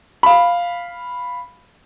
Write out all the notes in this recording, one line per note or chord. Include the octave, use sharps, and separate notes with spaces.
F5 B5